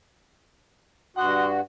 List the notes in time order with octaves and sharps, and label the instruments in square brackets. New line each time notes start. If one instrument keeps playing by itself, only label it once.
[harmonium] G2 F#4 [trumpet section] D#5 F#5 C6